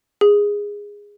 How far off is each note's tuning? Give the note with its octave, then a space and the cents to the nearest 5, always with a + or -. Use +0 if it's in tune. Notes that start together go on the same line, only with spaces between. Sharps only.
G#4 -15